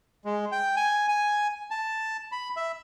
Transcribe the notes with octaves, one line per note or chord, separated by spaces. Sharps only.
G#3
G5
G#5
G#5
A5
B5
E5